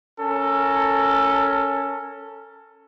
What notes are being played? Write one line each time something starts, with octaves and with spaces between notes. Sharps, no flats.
C#4 A4 A#4 G#5